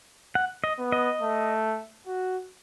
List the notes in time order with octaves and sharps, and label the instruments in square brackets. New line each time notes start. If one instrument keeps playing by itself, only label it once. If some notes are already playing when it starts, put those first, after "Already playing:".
[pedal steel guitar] F#5
D#5
[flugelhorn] B3
[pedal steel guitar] D#5
[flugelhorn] A3
F#4